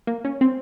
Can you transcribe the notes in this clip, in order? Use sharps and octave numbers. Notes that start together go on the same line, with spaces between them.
A#3
C#4
C4